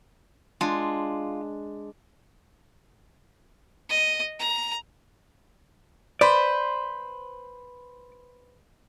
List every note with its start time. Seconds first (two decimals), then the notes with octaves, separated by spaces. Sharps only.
0.61 G#3 D4 F4
3.89 D#5
4.39 A#5
6.21 B4 C5 D5